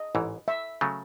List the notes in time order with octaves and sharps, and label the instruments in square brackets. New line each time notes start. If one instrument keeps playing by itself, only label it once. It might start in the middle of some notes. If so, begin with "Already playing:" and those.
Already playing: [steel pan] D#5
[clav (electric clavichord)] A1 G#2 E3
[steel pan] E5
[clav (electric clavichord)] C#3 F#3 A3